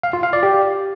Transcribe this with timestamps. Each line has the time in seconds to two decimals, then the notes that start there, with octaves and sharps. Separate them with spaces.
0.03 F5
0.13 F4
0.23 F5
0.33 D5
0.43 G4